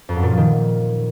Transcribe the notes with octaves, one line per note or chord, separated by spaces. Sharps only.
F2
F#2
A#2
F3
D#3